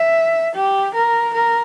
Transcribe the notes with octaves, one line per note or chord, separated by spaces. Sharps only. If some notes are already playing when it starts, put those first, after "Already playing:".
Already playing: E5
G4
A#4
A#4